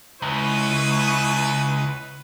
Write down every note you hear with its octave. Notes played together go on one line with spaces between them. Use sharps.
C#2 E4 B4 C#6 D#6